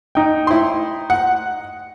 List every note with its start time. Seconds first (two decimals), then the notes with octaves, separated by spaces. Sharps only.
0.15 D#4 G5
0.47 E4 C6
1.10 F#5